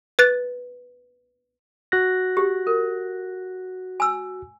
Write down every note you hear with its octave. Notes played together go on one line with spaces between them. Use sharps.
B4 F#6 A6
F#4 F#6 A#6
G4
A#4
G#5 E6